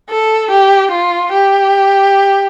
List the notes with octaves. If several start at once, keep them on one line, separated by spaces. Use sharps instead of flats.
A4
G4
F4
G4